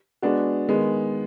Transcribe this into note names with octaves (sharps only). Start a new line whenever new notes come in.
G#3 B3 D4 F#4
D#3 G#3 B3